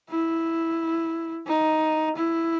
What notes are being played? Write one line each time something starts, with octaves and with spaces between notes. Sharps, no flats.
E4
D#4
E4